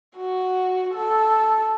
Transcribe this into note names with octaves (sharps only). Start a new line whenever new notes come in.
F#4
A4